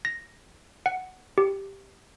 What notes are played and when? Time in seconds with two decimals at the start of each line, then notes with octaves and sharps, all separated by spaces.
0.05 A#6
0.86 F#5
1.38 G4